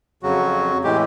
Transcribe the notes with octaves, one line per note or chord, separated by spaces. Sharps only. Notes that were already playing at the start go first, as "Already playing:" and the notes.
F2 C#3 F#3 F#4
A2 E3 G#3 G4